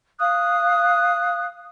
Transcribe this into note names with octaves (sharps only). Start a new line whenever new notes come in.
F5 D#6 F#6